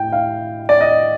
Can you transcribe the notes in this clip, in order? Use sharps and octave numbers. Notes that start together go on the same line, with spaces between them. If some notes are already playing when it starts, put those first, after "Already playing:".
Already playing: A2 G5
F5
D5
D#5